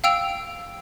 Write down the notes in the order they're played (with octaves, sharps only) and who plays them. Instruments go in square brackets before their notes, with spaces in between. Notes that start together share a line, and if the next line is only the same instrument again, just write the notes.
[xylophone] F5 G5 E6 D7 F7